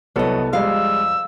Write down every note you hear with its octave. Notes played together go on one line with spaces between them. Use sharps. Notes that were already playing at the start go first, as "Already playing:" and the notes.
C2 F#3 B3 A4 D#5
F2 G3 G#3 F5 E6